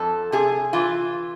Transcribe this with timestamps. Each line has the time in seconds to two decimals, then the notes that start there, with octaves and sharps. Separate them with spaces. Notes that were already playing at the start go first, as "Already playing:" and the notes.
Already playing: F2 A4
0.32 C3 G#4
0.73 E3 F4